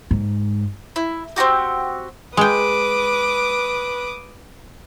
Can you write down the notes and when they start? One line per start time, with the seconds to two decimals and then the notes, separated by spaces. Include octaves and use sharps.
0.11 G#2
0.96 E4
1.36 C4 D#4 F#4 G4
2.37 G#3 B4 G5 D6 D#6